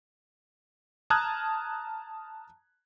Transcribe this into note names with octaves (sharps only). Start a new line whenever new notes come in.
A5 A#5 D#6 F6 F#6 G#6